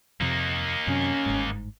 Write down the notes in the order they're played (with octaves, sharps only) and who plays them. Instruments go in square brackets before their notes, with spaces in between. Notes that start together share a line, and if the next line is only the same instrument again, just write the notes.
[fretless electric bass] F2 C3 [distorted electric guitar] A#3 D#4
[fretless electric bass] F#2 C3 [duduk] C#4
[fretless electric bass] G1 G#2